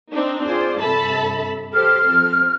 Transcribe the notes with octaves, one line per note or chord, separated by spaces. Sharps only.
C4 D4 D#4
F4 G#4 C5 D5
G2 C3 A4 E5 A5 B5
G4 A4 C5 F6
F3 C4